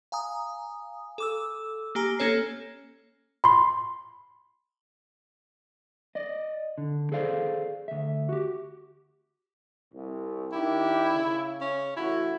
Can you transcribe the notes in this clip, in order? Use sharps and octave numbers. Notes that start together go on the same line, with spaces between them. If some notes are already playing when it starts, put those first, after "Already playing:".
F5 G#5 A#5 D#6
A4 D6 E6
A#3 G4 G#5 A#5
A#3 C#4 A4 C#5 C7
B5 C6
D5 D#5
D3
G#4 A4 C5 D5 F5
D2 E5
F#4 G4
C2
D#3 D4 E4 G4
C#3
C#4
A1 E4 F#4